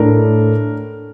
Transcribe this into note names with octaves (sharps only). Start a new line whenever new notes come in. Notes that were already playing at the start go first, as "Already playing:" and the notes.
Already playing: A2 A3 D4 A#4